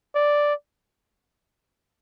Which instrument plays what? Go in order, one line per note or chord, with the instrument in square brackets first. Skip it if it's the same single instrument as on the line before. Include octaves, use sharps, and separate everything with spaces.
[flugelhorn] D5